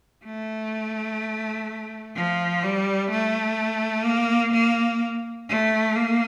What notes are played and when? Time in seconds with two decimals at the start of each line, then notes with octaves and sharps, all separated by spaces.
0.25 A3
2.16 F3
2.63 G3
3.11 A3
4.06 A#3
4.53 A#3
5.49 A3
5.96 A#3